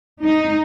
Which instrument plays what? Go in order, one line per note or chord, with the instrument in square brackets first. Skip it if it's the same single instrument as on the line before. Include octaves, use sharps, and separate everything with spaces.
[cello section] D#4